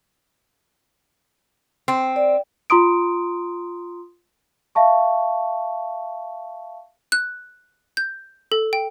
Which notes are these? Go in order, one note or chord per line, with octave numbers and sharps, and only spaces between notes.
C4
D5
F4 A#5 C6 D#6 D7
E5 F5 A5 C#6
F#6
G6
A4
G5